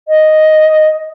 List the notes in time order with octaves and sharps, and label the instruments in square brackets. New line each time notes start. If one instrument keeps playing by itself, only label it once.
[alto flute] D#5